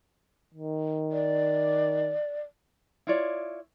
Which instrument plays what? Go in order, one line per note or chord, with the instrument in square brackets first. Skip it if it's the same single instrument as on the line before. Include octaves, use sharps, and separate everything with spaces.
[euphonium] D#3
[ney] D5
[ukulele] E4 F4 C#5 D5